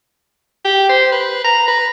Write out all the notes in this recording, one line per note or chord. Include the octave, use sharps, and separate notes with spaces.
G4
C5
B4
A#5
B4